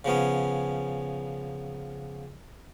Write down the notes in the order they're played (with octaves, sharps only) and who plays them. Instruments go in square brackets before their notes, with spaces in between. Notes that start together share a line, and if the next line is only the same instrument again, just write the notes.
[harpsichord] C#3 F3 B3 C#4